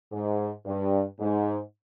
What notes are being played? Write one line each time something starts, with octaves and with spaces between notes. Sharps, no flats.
G#2
G2
G#2